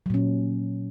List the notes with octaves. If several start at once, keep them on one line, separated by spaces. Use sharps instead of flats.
A#2 F#3 C#4